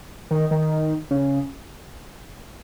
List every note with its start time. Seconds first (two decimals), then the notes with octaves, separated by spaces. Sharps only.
0.31 D#3
0.51 D#3
1.11 C#3